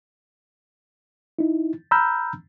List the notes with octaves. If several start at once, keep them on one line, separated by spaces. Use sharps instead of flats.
D#4 E4
A#5 B5 E6 F6 G6